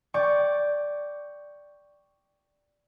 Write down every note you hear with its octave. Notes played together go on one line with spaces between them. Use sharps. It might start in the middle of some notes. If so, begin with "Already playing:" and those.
D5 G5 C#6